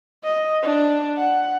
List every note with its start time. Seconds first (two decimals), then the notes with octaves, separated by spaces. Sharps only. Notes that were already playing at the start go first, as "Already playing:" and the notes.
0.24 D#5
0.62 D4
1.17 F#5